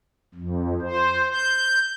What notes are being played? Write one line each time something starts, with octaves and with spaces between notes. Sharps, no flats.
F2
C5
G6